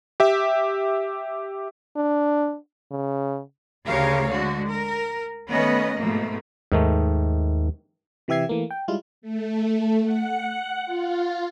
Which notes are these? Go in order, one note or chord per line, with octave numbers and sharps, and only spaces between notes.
G4 E5
D4
C#3
D2 C#3 G4 A#4 C#5 F5
D3 G#3 F#4
A#4
D#3 A3 B3 C#4 B4 D#5
G#2 B2 F3 A3 A#3
D#2 G#2 D#3 A3
C3 E3 G4 E5 G#6 C7
E3 A3 A#3
G5
G3 G#3 E4 F4
A3
F#5
F4